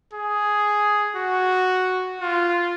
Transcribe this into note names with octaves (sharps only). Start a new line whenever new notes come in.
G#4
F#4
F4